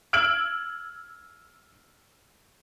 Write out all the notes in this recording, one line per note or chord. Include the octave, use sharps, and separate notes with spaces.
E6 F6 G#6 D7 F#7